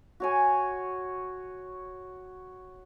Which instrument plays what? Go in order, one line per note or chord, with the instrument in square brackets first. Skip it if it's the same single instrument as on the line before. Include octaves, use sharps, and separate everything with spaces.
[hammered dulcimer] F#4 C#5 G#5